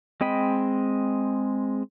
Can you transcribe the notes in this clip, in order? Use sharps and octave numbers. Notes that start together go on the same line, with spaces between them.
G#3 C4 D#5 G5 B5